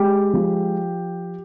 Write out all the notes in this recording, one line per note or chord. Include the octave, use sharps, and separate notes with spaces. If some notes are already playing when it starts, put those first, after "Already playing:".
Already playing: G#3 G4
F3